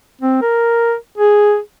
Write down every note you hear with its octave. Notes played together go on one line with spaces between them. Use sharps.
C4
A#4
G#4